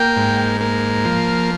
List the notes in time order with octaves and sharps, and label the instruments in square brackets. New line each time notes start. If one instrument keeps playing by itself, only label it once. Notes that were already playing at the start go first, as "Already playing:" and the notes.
Already playing: [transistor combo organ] A#3 G5
G#2
A#3
F3